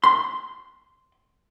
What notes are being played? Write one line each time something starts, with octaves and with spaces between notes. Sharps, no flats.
C6